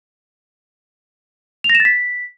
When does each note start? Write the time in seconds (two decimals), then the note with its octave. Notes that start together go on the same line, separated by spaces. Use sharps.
1.64 F7
1.70 A#6
1.75 E7
1.80 A6
1.85 B6